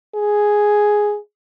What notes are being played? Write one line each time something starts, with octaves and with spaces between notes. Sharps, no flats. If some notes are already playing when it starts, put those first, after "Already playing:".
G#4